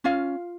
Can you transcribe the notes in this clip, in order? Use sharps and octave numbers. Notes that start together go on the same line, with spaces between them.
C#4 F4 F5